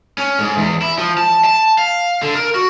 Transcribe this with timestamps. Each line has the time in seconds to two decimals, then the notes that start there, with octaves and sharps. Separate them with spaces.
0.18 C#4
0.39 G#2
0.58 E2
0.82 E4
0.98 F3
1.18 A5
1.45 A5
1.78 F5
2.22 D3
2.34 A#4
2.55 F#4